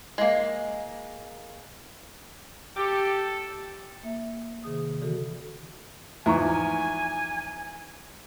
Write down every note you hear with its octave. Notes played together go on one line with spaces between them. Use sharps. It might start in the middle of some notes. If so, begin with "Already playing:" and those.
G#3 A#3
G4 A4
A#3 E5
C3 D#3 G#4 D#6
D3 E3 F#4 A4
E2 G#2 F3 E5 G#5 A#5 C#6